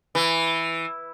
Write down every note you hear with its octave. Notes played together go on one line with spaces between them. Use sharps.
E3